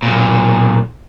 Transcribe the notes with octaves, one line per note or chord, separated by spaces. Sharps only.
B1 A#2